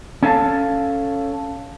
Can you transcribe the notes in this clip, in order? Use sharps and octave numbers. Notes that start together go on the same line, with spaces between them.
C#4 A4 F5 A5